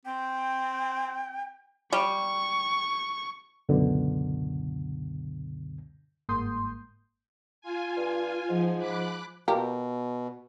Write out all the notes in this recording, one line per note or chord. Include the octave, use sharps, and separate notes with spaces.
C4 G5
G3 C#6
C#2 F#2 B2 D3
G1 G#2 A#3 C6 D#6 G6
F4 G#5
G2
G#2 F3
B5 D6 F#6
B2 F4 G4 A#4